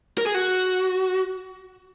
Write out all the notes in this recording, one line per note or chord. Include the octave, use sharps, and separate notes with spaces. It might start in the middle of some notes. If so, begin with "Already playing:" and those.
A#4
G#4
F#4